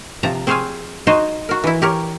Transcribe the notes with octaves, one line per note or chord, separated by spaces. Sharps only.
C3 F3 A5 A#5
C4 G#4 C5 C#5 F5 G#5
D#4 F#4 C5 D#5 G#5
F#4 A#4
E3 E4
G4 A#4 C#5